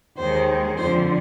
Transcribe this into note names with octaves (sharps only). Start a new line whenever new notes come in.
D#2 D#3 G#3 C5
F2 D3 F3 C5